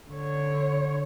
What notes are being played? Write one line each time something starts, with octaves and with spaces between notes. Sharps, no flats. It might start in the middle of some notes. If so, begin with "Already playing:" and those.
D3 C#5